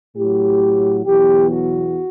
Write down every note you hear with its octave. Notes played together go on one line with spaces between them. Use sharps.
A2 F#3 G4
E2 B2 F#3 G4
F#4